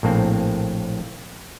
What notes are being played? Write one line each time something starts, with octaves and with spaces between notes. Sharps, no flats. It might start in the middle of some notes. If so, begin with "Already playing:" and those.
A#1 A2 A#3 C4